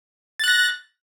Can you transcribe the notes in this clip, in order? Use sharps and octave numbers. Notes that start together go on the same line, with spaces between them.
F#6 A6 A#6